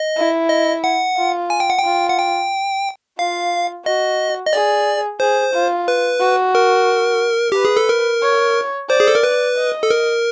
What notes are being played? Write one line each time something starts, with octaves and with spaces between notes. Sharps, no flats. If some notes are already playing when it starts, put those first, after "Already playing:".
Already playing: D#5
E4
D#5
F#5
F4
G#5
G5
F#5
G5
F4
F#5
G5
F4 F5
F#4 D#5
D#5
G#4 D5
G#4 C5
F4
B4
F#4
A#4
G4 B4
G#4
A4
A#4
C#5
C5 D5
G#4
A4
A#4
B4
D#5
A4
A#4